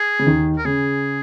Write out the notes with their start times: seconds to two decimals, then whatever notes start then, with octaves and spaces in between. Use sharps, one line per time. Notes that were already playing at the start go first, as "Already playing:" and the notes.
Already playing: G#4
0.19 C#3
0.27 D#2 D#3
0.58 A#4
0.65 C#3 G#4